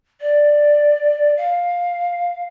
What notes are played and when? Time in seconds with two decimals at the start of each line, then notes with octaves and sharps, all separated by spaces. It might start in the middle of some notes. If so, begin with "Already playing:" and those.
0.21 D5
1.37 F5